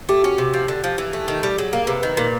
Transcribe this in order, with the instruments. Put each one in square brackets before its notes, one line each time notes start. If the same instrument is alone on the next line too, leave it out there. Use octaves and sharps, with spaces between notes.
[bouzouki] A3 [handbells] G4
[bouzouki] C#4 [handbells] F#4
[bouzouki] C3 [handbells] G4
[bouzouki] F3
D3
F3
E3
A3
D#3
G3
[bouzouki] F#3 [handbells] G#4
[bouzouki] A#3 [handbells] A#4
[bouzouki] C3 [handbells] B4
[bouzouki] D#3 [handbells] B4
[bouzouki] A#2 [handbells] A#4